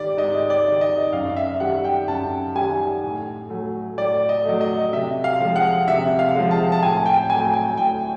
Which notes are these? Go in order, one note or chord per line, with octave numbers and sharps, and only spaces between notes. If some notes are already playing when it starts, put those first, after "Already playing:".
Already playing: G#2 D#3 G3 D5
G#2 D#5
D5
D#3 G3
D#5
F#2 F5
E5
D#3 G3 F#5
G5
F#2 A5
D#3 G3 G#5
A2
F#3 A3
A2 D5
D#5
F#3 A3
D#5
C3 E5
F5
F3 G#3
F#5
C3 E5
F5
F3 G#3
A5
A5
A2 G#5
G5
F#3 A3 G#5
G#5
A2 G5